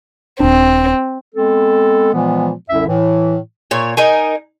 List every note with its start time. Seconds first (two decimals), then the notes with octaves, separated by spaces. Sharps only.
0.40 D#1 C4 D4
1.35 G#3 B3 C4 A4
2.13 A#2 E3 F3 G#3 B3
2.70 C2 F#2 D3 E4 E5
2.87 A2 E3
3.71 A#2 C#5
3.97 D#4 A#4 G#5